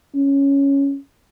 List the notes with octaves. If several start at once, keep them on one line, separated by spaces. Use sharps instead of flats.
C#4